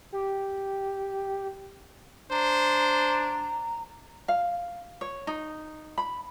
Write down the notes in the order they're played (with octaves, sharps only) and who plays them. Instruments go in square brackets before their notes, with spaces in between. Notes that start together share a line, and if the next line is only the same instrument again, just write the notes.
[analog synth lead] G4
[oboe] D4 [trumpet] C5 [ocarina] A#5
[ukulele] F5
C#5
D#4
B5